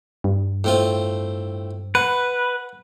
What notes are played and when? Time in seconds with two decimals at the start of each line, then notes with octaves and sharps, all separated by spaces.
0.24 G2
0.64 A2 C4 F4
1.95 B4 F#5